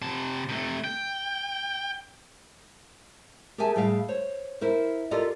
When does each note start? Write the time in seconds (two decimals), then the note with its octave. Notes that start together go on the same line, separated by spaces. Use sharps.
0.02 C3 A5
0.49 C3 A3
0.84 G5
3.58 G4 G#4 A#4 E5 G#5 A5
3.76 A2 G3 G#4 E5 F5
4.08 C5 C#5
4.61 E4 A#4 C5
5.11 F4 G4 A4 A#4 D5 D#5